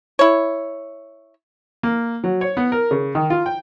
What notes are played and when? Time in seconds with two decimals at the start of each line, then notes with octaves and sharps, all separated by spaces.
0.19 E4 C#5
1.83 A#3
2.24 F#3
2.41 C#5
2.57 B3
2.72 A#4
2.91 C#3
3.15 D#3
3.30 F4
3.46 G5